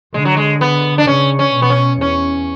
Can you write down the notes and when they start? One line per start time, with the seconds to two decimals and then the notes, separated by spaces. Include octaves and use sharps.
0.14 D3 G#3
0.25 F#3
0.37 G#3
0.61 B3
0.98 D4
1.07 C#3 C#4
1.39 C#4
1.54 B2
1.62 B3
1.70 C#4
2.01 E2 C#4